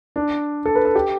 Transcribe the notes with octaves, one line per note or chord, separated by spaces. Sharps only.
D4
A4
B4
A4
G4